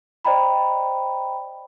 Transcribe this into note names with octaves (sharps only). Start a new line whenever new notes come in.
C5 D5 D#5 G5 A#5 B5